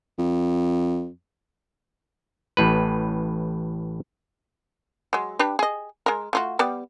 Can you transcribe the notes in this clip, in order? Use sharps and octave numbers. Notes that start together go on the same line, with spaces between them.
F2
A1 A2 B4
F#3 G#3
D4 G4 B4
G#4 D#5
G#3 A#4
A3 F4 F#4
G3 B3 D5